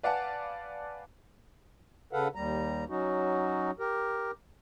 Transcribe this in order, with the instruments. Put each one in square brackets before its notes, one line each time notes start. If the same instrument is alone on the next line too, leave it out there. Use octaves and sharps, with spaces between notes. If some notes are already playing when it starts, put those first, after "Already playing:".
[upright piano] B4 D5 F5 F#5 G#5 A5
[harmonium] C#3 A4 B4 F5 F#5
D#2 G3 A#5
F#3 C#4 D#4 F#4
G4 A#4